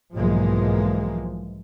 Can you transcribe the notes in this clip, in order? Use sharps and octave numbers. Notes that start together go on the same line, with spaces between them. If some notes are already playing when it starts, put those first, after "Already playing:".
B1 G#2 E3 F3 G#3 A#3